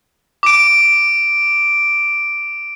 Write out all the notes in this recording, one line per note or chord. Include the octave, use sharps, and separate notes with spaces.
D6 D7